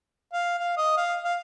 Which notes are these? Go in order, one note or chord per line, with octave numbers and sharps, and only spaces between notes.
F5
F5
D#5
F5
F5